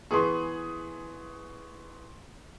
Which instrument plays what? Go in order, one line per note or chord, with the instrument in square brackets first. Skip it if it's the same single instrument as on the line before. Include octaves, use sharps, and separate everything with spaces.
[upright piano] E3 B3 G#4 [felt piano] C6 C#6